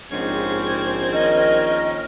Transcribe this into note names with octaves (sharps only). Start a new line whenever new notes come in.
A#1 G#2 C4 C#4 G4 G#6
D#3 C#4 A#4 D#5